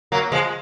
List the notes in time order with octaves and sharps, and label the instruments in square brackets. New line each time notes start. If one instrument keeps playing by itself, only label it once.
[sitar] F#3 A#3
F3 G#3